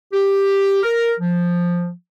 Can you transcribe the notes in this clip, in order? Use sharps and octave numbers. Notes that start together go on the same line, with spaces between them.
G4
A#4
F3